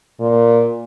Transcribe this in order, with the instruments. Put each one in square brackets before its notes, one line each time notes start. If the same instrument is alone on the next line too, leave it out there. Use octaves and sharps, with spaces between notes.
[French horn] A#2